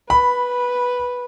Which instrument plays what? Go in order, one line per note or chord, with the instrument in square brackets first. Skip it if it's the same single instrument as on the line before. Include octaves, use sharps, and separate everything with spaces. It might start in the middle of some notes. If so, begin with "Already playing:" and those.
[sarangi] B4 [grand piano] B5